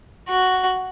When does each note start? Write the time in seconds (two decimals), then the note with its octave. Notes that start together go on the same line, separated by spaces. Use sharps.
0.29 F#4